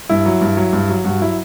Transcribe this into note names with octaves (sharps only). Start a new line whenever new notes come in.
G2 E4
F#3
G2
F#3
G2
F#3
G2 F#4
F#3 E4